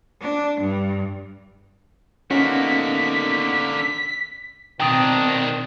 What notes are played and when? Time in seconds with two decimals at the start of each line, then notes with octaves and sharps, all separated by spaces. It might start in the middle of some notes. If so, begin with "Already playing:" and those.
0.21 D4
0.60 G2
2.31 D3 A#3 B3 C#4 D#4 F#4 B6
4.80 B2 D#3 C4 D4 G5 D#6